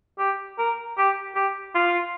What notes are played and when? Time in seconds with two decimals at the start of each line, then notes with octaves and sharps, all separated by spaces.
0.19 G4
0.59 A#4
0.98 G4
1.36 G4
1.75 F4